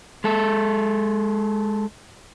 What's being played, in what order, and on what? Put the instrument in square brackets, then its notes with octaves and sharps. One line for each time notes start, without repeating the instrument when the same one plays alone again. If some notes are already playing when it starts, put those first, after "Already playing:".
[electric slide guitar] G#3 A4